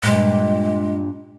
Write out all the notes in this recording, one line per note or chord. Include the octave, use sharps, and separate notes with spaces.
G2 A#2 G#3